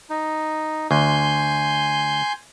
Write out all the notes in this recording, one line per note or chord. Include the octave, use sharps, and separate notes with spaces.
D#4
D2 G#5 C6 G6